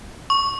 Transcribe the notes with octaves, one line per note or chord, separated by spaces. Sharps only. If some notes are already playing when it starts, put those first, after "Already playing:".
C#6